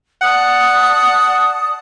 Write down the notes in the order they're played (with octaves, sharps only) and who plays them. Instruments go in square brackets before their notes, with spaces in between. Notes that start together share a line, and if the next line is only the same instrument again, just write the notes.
[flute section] D5 A5 D#6 [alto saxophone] F#5